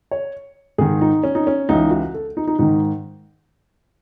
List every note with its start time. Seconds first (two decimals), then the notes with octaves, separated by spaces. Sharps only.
0.11 C#5
0.78 G#2 D#3 G#4
1.01 D#4
1.24 C#4
1.35 D#4
1.47 C#4
1.69 C#2 C#3 E3 D#4
1.91 F#4
2.14 A4
2.37 D#4
2.47 D#4
2.59 G#2 D#3 D#4